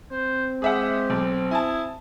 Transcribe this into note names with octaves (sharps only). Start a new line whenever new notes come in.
C4 C5
G#3 G4 G#4 E5 F#5
B1
E4 G#4 G#5 A5